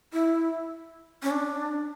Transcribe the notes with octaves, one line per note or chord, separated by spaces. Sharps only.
E4
C#4
D4